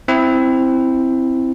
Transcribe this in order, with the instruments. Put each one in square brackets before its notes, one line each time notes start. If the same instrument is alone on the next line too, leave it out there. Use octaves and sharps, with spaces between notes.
[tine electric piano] C4 E4